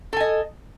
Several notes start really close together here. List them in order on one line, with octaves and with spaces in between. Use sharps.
A4 G#5 D#5